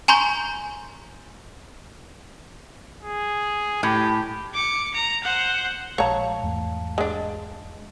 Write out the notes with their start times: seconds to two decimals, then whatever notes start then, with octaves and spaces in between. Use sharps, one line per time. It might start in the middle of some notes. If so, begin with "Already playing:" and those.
0.08 G#5 A#5 C6 C#6 G6
3.02 G#4
3.83 A2 G4
4.54 D6 C#7
4.94 A#5
5.24 C5 F#5
5.98 A#1 D#2 G#3 C#5 F5 A5 A#5
6.43 E2 G#2 A3
6.98 G#3 D4